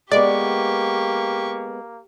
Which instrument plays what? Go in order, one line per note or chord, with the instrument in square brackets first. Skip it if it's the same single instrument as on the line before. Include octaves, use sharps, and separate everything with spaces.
[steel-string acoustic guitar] G#3 B3 [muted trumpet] A#3 [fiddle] G4 C#6 [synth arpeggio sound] D5